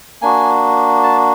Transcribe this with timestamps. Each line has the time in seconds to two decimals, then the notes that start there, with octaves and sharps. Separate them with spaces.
0.22 A#3 D4 F#4 G#5
1.03 A5